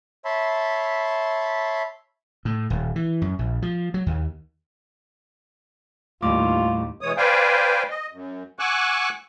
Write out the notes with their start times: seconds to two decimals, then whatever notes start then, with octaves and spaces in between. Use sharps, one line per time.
0.25 C#5 E5 A5 B5 C6
2.45 A2
2.70 D#1
2.96 E3
3.22 F#2
3.39 A#1
3.62 F3
3.94 F#3
4.06 D#2
6.23 D#2 A2 G3 F4 D6
7.01 B2 E3 G#3 C#5 D#6
7.17 B4 C5 D5 F5 G5 G#5
7.90 D#5
8.12 F#2
8.59 F#5 G#5 C#6 D6 E6 F#6